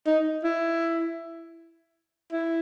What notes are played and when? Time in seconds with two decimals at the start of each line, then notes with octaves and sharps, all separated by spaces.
0.07 D#4
0.44 E4
2.33 E4